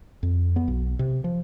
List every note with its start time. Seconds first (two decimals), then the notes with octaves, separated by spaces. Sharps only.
0.23 F2
0.56 B3
0.68 B1
0.99 C3
1.24 F3